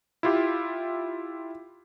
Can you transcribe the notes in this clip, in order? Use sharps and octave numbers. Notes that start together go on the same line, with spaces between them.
E4 F4 G4